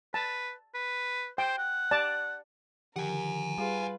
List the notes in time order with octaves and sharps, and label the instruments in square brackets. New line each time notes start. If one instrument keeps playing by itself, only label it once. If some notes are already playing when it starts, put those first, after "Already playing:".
[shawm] B4 [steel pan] A5
[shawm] B4
[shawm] C5 [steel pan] G5
[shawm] F#5
[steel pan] D5 A5
[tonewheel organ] D3 D#3 F3 [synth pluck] G4 [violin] A#4 [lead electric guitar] F#5 G#5
[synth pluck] G3 G#4 [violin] F4 B4